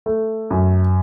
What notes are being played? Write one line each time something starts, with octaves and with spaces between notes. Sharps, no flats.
A3
F#2